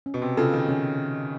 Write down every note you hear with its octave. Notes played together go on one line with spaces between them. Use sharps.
C#4
B2
C3
C#3 F4 A4
D#3
D#3 C#4